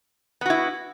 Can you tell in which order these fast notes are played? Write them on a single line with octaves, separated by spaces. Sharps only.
B3 F#4 E4